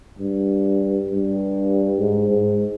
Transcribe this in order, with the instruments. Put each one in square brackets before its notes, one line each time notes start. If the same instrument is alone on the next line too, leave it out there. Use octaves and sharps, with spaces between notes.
[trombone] G2
G2
G#2
G#2